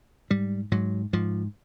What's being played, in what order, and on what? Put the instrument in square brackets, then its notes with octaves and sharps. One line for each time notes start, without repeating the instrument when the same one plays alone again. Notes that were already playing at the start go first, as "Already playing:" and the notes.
[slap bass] G#2 G3
G#2 F#3
G#2 F3